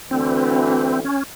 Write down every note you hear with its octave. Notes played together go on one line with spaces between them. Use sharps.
D2 E3 C4
C#4